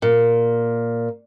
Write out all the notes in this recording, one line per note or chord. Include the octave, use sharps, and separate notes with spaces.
A#2